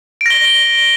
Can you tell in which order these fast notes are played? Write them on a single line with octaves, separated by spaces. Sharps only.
D7 A#6 G7